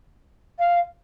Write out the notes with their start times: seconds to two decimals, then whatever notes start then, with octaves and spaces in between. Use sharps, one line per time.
0.59 F5